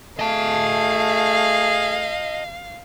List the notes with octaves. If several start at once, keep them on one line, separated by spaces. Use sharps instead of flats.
A3 G#4 D#5 F5 A5